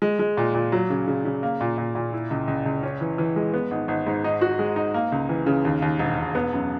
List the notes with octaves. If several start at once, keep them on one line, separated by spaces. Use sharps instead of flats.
G#3
G#3
A#2
A#2
F#3
C#3
C#3
C#3
A#3
A#2
A#2
A#2
E4
C#2
C#2
C#2
C#4
E3
E3
G#3
B3
G#1
G#1
G#2
D#4
F#4
G#3
D#4
A#3
C#2
E3
C#3
D#2
D#2
E1
E1
B3
F#2